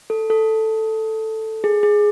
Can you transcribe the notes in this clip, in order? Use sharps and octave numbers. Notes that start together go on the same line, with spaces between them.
A4
A4
G#4
G#4